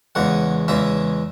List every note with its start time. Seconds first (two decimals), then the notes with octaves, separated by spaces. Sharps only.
0.15 E2 C#3 G#3 F#5
0.68 E2 C#3 G#3 E5